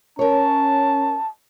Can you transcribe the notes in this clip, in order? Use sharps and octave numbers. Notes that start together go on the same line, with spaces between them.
C#4 A#4 C#5 A5